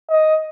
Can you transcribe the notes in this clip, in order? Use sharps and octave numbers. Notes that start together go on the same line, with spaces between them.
D#5